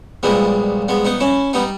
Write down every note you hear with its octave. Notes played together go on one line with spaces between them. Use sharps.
A#1 A#2 G3 G#3 B3
G#3 B3
B3 D#4
C#4 E4
G3 B3 D#4